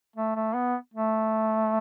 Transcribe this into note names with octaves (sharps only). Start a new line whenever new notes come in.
A3
A3
B3
A3